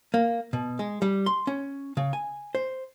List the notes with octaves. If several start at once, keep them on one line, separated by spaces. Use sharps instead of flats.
A#3
B2
G#3
G3
C6
C#4
C#3
G#5
C5